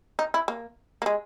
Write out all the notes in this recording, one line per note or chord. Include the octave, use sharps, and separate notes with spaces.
D#4
E4
A#3
A#3
G#3